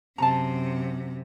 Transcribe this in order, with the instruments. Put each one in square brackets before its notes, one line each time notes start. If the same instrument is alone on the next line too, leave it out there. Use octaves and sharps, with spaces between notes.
[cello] F#2 C3 [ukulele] A5 A#5